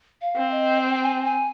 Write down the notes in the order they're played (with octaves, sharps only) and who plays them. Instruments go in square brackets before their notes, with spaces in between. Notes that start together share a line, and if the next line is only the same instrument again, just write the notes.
[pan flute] F5
[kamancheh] C4
[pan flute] D#5
G5
G5
G#5
G#5